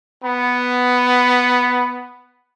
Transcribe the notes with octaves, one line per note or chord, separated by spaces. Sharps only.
B3 B5